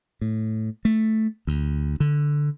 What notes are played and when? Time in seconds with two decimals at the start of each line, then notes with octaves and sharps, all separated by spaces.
0.21 A2
0.85 A3
1.47 D2
2.00 D3